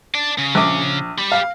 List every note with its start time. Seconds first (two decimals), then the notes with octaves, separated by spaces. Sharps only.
0.15 D5 A5
0.38 C#3
0.55 A#1 D6
1.18 G4 B5
1.32 F5